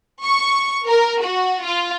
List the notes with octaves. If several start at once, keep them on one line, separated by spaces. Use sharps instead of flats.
C#6
A#4
F#4
F4